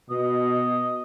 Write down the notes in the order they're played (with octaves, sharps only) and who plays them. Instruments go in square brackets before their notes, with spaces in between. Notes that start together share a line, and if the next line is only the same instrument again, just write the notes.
[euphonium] B2 [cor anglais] D#5